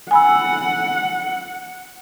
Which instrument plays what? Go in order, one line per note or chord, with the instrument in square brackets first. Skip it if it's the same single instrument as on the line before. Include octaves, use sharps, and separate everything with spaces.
[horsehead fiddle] F#5 [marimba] G#5 B5 E6